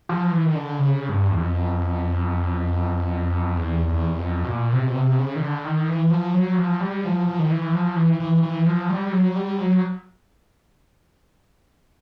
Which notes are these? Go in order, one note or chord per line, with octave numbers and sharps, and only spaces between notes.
F3
E3
D#3
D3
C#3
G2
E2
F2
E2
E2
F2
B2
A#2
C3
B2
C3
C#3
D#3
D3
D#3
E3
F3
F#3
F3
G3
F3
F3
D#3
E3
F3
E3
E3
E3
F3
G3
F#3
G3
F#3